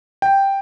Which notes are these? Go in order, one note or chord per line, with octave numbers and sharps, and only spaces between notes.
G5